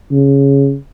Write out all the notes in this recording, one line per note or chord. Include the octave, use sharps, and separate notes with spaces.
C#3